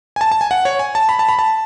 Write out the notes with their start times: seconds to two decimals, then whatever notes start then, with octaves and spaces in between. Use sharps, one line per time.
0.16 G#5
0.21 A5
0.32 A5
0.41 G#5
0.51 F#5
0.65 C#5
0.79 G#5
0.95 A5
1.09 B5
1.19 A5
1.29 B5
1.39 A5